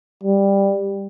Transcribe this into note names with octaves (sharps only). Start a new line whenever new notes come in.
G3